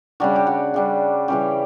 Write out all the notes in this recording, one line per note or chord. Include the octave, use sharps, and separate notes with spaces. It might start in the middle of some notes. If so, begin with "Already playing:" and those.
C#3 G3 D4 F#4
G4
F#4
C#3 G3 D4
C#3 E3 G3 C#4 G4